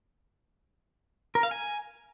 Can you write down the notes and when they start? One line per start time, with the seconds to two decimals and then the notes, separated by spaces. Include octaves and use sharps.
1.35 A#4
1.43 F5
1.51 G#5